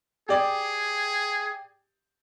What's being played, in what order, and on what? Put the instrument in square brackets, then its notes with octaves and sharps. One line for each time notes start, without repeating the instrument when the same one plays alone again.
[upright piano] G4 D5 [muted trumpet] G#4